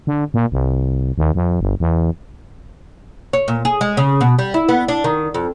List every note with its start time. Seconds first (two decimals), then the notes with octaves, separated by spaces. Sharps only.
0.07 D3
0.34 A#2
0.52 C2
1.18 D#2
1.35 F2
1.61 G1
1.80 E2
3.33 C#5
3.48 A#2
3.65 G#4
3.81 G#3
3.97 C#3
4.21 B2
4.39 G3
4.54 E4
4.69 B3
4.88 D4
5.04 D#3
5.34 F2